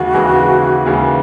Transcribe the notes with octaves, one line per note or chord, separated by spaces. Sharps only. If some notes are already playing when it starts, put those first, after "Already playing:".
Already playing: D#2 C#3 E3 G#3 F#4
D#2 C#3 E3 G#3
D#2 C#3 E3 G#3